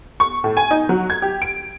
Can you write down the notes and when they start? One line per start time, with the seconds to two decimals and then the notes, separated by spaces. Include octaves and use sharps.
0.20 C#6
0.44 A2
0.57 G#5
0.71 D#4
0.89 F#3
1.10 G#6
1.22 G4
1.42 D7